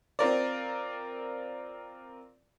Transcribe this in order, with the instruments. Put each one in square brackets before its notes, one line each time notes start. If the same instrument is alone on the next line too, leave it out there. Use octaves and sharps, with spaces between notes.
[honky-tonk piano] C4 F4 A#4 D5